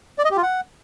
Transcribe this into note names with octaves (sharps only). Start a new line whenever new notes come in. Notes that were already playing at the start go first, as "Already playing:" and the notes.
D5
D#5
G4
F4
F#5